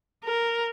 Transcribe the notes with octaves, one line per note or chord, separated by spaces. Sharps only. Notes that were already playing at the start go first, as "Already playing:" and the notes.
A#4